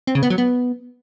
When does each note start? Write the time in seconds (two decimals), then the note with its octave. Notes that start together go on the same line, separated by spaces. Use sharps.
0.07 C4
0.15 C#3
0.23 B3
0.30 F#3
0.38 B3